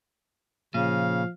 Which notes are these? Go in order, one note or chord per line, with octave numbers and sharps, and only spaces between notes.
A#2 C#3 F3 F5